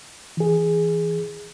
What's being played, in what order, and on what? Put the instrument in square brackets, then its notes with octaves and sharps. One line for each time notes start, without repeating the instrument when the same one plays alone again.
[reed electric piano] E3 G#4